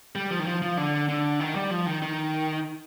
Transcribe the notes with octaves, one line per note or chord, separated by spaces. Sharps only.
G3
F3
D#3
F3
F3
D3
D3
D#3
G3
F3
D#3
D#3